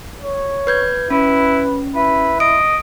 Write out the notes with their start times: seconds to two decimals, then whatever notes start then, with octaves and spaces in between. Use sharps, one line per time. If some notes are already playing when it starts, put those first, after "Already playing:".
0.22 C#5
0.67 B4 G6 G#6
1.10 C#4 E4 B4
1.95 E4 B4
2.40 D#5 D7